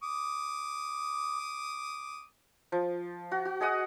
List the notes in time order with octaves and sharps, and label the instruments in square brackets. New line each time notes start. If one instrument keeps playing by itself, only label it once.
[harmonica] D6 D#6
[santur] F3
F#4
F#4
G#4 D#5 F#5 D#6